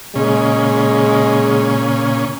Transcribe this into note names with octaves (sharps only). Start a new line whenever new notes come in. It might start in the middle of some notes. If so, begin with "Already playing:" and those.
A#2 C#3 G#3 C#4